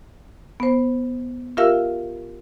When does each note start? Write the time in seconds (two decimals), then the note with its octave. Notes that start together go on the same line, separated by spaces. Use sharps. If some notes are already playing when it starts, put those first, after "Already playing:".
0.60 B3 C5
1.57 F4 G4 A#4 E5 F5 E6